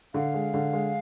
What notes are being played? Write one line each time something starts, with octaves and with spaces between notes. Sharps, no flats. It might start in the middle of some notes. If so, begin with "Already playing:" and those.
D3 F5
G#3
D3
G#3